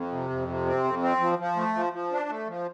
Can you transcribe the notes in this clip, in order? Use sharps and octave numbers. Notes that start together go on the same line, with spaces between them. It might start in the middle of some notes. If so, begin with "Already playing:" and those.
Already playing: F2
C3
F2
C3
C4
F2
C4
F3
F3
A3
F3
F3
D4
A3
F3